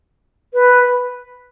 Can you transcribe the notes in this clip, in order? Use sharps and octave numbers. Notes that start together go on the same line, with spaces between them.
B4